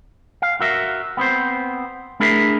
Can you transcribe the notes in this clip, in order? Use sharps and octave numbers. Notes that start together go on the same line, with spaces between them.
F5
F#4 A#4 E5
B3 C4 C5
A3 D4 E4 G#4 A#4 E5